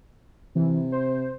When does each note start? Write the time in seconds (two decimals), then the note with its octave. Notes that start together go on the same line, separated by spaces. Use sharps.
0.55 C3 E3
0.92 C5